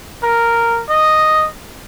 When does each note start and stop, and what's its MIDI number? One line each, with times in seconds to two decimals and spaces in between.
0.23 0.81 70
0.90 1.48 75